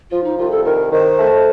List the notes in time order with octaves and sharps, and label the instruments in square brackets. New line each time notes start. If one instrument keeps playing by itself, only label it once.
[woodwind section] F3 [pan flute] F4
[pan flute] D#4
[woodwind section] C2 [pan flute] F4
[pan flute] A4
[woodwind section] D#3 [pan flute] A#4
[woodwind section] D#3 [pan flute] C5
[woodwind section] A3